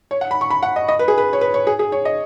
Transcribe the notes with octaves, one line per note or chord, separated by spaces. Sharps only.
C#5
F#5
B5
C#6
B5
F#5
D#5
D#5
B4
G#4
B4
C#5
B4
C#5
G#4
G#4
C#5
D#5